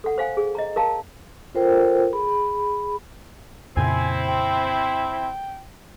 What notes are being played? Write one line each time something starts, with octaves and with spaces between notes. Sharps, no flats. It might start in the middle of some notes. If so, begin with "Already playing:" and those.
A4 F#5
C5 F5 G#5
G#4
D#5 A#5
A#4 F5 A5 A#5
F4 A4 A#4 C5 G5
G#4 B5
F2 A#2 C#3 C4 E4 G#5
G5